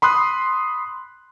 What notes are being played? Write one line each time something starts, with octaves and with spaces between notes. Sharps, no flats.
B5 C6 D#6 F#6